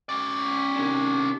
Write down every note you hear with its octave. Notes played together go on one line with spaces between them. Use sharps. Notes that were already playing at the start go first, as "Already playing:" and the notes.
C#4 D5
C3 D#3 D4